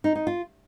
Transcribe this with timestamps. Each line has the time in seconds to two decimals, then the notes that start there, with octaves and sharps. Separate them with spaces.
0.04 D#4
0.15 D#4
0.27 F4